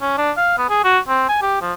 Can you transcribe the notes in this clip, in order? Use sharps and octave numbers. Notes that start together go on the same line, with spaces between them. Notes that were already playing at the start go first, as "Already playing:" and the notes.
C#4
D4
F5
B3
G#4
F#4
C4
G#5
G4
F3